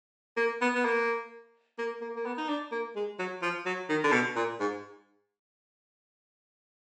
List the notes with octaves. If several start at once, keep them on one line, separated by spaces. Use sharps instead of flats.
A#3
B3
B3
A#3
A#3
A#3
A#3
B3
D#4
D4
A#3
G#3
F#3
F3
F#3
D#3
D3
B2
A#2
G#2